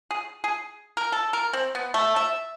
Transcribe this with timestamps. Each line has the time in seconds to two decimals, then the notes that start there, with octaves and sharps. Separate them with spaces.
0.11 G#4
0.44 G#4
0.97 A#4
1.12 A4
1.33 A#4
1.53 C4
1.75 B3
1.94 A3
2.16 E5